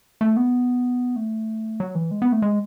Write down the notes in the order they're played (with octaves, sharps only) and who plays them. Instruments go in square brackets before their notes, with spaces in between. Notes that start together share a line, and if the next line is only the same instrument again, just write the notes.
[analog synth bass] A3
B3
A3
F#3
E3
G#3
B3
A3
G#3